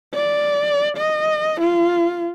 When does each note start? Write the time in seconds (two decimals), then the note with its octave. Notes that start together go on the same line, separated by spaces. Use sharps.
0.14 D5
0.97 D#5
1.61 F4